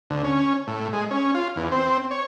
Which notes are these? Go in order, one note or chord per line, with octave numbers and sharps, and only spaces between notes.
D2
C#4
A2
G#3
C#4
F4
E2
C4
C#5